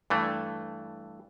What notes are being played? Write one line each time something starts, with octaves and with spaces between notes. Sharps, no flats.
G2 E3 A3